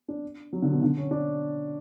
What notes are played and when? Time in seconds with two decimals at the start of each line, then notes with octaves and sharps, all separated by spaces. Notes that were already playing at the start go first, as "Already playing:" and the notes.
0.08 D4
0.53 F#3
0.62 D3
0.72 B2
0.82 D3
0.97 C#4
1.11 D4